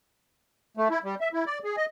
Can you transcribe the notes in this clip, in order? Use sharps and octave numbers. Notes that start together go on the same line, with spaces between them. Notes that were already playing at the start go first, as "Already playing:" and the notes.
A3
E4
G3
E5
E4
D5
G#4
D#5